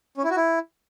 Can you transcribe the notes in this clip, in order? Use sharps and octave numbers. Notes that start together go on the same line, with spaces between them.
C#4
E4
F#4
E4